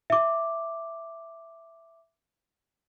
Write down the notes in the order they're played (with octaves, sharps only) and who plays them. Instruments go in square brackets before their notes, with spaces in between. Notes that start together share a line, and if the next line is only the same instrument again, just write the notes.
[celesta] E5 D6